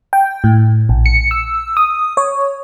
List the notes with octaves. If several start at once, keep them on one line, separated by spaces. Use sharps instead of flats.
G5
A2
A#1
C#7
E6
D#6
C#5